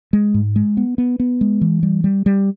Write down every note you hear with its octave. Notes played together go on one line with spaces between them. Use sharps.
G#3
G#2
G#3
B3
B3
B3
G#3
E3
G3
G3
G3